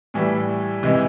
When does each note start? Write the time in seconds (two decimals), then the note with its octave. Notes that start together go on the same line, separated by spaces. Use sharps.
0.14 A2 E3 G3
0.83 C3 E3 G#3